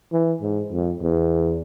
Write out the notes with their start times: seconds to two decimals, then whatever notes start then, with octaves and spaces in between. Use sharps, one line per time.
0.12 E3
0.41 G#2
0.72 F2
1.01 E2